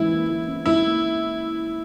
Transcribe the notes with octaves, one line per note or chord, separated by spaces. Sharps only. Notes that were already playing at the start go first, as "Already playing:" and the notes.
Already playing: G#2 E3 C#4 E4
A#3
E3
C#4
G#2 E4
A#3